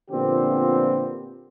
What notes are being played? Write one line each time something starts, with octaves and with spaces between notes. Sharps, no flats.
A#2 D3 F3 B3 C4 G4